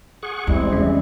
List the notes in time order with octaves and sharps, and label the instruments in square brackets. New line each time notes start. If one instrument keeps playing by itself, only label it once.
[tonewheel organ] G#4 F#5 C#6
[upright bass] E2 [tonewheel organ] G3 G#3 [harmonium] C4 E4
[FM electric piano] C#3